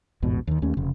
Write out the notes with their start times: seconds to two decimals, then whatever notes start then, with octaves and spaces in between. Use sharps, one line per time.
0.22 A1 E2 G#2 B2
0.47 D#2 D#3
0.62 D#2 A3 C#4
0.77 F1 C#3